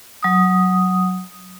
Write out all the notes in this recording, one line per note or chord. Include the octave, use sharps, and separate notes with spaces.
F#3 D#6